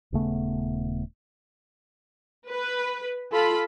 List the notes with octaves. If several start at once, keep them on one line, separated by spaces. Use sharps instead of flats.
D#1 C#3 A3 B3
B4
F4 A4 B5